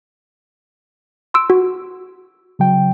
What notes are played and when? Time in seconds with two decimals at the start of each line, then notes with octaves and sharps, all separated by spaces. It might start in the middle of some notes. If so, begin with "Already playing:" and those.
1.34 C6 E6 D7
1.50 F#4
2.59 C#3 F#3 G5